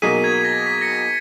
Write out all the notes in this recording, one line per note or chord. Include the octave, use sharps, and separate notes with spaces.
B2 F#3 A#3 D#4 G#4 B6 D#7
G#6
A#6
B6
A#6 C#7